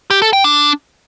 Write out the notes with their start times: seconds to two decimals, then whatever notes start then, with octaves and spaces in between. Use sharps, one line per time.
0.10 G4
0.22 A4
0.33 G5
0.44 D4